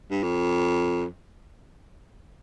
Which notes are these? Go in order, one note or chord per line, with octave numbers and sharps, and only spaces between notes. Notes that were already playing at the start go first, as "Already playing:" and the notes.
G2
F2